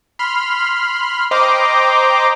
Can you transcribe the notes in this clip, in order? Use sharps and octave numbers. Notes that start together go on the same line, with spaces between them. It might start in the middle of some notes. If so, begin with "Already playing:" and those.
B5 C6 F6
C5 D#5 G5 A#5 C6 D6